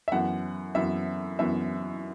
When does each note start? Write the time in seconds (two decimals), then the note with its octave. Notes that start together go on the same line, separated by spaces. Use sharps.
0.08 E5
0.12 F#2 E3 B3 F#5
0.75 F#2 E3 B3 E5
1.39 F#2 E3 B3 E5